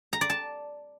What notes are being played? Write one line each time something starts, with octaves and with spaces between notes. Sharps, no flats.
A#5
D5
A5